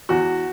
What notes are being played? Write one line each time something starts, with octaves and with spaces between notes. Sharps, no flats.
E2 F#4